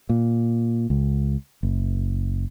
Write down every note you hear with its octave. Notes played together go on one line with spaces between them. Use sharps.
A#2
C#2
F#1